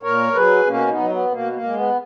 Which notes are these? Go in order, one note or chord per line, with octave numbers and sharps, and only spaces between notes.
A#2 A#4 C#5
F#3 G#4 B4
B2 A#3 C#4
B3 D#4
F#3
B3
B2 A#3
A#3
G#3
B3